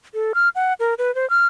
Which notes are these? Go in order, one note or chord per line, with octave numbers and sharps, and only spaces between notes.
A4
F6
F#5
A#4
B4
C5
F6